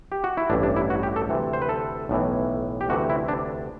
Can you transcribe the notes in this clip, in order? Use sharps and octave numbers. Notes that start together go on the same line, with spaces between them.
G4
F#4
E4
A1 G2 E3 D4
D4
E4
F#4
G4
A4
D2 C3 E3
C5
B4
A4
B1 A2 E3
G4
D2 C3 E3 F#4
E4
D4